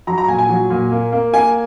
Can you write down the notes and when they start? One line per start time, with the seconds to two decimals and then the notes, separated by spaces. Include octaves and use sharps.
0.07 F#3 A#5
0.18 A#5
0.28 A#2 G#5
0.39 G#5
0.49 F#3
0.70 A#2
0.91 A#3
1.12 A#3
1.33 A#3 G#5